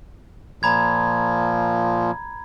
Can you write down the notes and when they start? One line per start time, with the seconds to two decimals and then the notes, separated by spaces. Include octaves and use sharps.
0.63 A#2 F3 A#5 B5 G#6